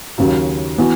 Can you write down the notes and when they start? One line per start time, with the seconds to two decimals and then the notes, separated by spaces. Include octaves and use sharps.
0.18 D#2 C#3 F#3
0.78 E3 B3 F#4